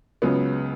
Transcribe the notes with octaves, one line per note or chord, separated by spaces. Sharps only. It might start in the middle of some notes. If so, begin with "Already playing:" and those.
C#2 C#3 F#3 B3